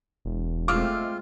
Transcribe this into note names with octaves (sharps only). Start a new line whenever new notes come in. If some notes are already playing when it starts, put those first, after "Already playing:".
E1
G#3 A3 C4 F4 D6 E6 F6